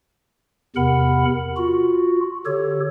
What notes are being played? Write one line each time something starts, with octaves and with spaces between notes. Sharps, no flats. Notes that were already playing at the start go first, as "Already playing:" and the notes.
E2 C3 A#4 F#5 B5
F4 F#4
D3 G4 A4 C#5